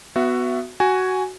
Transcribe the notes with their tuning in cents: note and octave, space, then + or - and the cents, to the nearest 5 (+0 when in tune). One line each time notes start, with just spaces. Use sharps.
B3 +10 F#4 +0 E5 +25
F#4 +10 G#5 +0